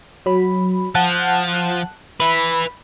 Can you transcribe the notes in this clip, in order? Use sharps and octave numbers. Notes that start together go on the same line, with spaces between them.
F#3 B5
F3 F#5 A5 F#6
B4 E5 B5